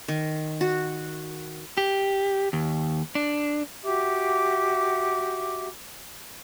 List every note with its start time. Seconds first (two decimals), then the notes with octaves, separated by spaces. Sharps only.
0.08 D#3
0.61 F#4
1.78 G4
2.53 D#2
3.15 D4
3.85 F#4 G4 E5 D6